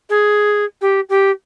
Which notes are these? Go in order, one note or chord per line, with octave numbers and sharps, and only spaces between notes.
G#4
G4
G4